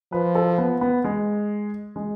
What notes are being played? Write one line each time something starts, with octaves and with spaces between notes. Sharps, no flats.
F3 B4
A4
B3
B3
G#3
G#3